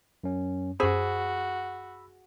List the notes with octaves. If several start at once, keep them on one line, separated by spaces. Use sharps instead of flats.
F#2 C#4
F#2 F#4 G#4 C5 B5 E6